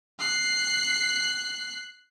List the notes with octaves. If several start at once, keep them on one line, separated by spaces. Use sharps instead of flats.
F#6 C7